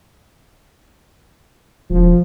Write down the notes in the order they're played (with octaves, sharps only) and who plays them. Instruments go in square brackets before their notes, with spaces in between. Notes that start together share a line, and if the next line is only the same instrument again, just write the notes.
[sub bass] E1 [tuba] F3